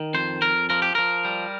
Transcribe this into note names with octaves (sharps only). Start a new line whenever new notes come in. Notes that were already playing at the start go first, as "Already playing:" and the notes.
Already playing: D#3
F2 C5
F2 A#4
F3 A#4
G4
F3 A#4
G3